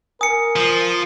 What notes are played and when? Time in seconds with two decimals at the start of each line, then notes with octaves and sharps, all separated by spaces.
0.21 A#4 G#5 D#6 C#7
0.56 F3